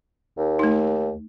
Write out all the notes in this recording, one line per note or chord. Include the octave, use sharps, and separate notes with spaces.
D#2
A3 D#4